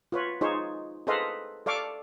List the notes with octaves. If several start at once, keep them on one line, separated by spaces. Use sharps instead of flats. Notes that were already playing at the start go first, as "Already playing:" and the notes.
F4 B4 C#5
D#4 F4 G#4 C5 C#5
G#4 A4 B4 C5 D#5 F5
A4 D5 F5 C#6 D6